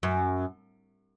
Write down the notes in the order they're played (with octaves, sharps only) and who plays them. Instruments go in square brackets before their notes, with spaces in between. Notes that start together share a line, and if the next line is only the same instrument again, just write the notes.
[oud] F#2